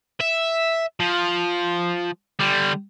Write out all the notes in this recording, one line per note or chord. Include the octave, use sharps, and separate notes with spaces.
E5
F3
D3 G3